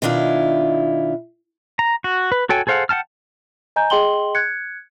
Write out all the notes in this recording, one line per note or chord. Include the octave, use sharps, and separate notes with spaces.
B2 D#3 D4 E4 F4
A#5
F#4
B4
F#4 A4 C#5 G5 G#5
G#4 A4 C5 F5 F#5
F#5 G5 A5 F6
D#5 G#5 A#5 G6
G#4 D#5 G5 C6 F#7 G7
F#6 G#6 C#7